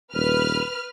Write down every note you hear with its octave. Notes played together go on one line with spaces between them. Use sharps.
D#1 B4 F6